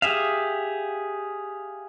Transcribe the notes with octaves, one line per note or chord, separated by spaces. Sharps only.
G4 G#4 E5 F5